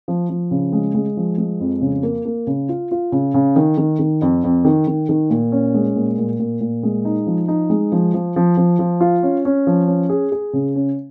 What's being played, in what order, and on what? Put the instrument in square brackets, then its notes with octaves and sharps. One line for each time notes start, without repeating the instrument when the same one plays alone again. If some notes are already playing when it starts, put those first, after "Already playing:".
[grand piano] F3
F3
C#3
G#3
G#3
F3
G#3
F2
C#3
A#3
A#3
C#3
F4
F4
C#3
C#3
D#3
D#3
D#3
F2
F2
D#3
D#3
D#3
A#2
C#4
G#3
A#2
A#2
A#2
A#2
G#3
D#4
F3
D#4
G#3
F3
F3
F3
F3
F3
F4
C#4
C#4
F3
C#4
G#4
G#4
C#3
C#4